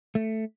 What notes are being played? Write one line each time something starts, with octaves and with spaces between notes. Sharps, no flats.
A3